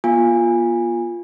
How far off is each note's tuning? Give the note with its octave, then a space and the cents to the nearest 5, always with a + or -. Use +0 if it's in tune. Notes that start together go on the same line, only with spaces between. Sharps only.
B3 -45 F4 +0 G#5 -20